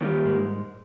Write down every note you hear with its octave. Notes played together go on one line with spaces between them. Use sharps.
D#2 D#3 G3
G#2 G#3